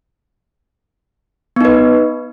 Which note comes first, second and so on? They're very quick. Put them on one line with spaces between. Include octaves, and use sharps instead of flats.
B3 D#4 B4